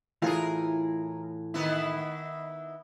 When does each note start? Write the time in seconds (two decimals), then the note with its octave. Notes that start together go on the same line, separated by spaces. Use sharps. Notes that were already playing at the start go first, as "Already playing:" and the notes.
0.22 A2 E3 F4 G#4 A#4
1.54 D#3 B3 E4